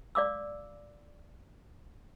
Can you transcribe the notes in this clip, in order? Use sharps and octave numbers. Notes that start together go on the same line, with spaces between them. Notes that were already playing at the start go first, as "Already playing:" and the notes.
D5 F5 D6 E6